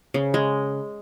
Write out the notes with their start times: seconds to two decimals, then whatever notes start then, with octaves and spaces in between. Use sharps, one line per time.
0.14 C#3
0.34 G#3